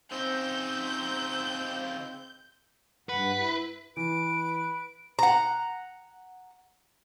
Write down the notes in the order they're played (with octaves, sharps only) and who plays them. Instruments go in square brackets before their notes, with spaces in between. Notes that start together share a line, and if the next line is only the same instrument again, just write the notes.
[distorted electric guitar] C#3 D#4 [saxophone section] C4 [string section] G6
[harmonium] G2 F#5 [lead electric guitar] B4
[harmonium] E4
[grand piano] E3 [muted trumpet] B4 [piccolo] D7
[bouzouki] F#5 A#5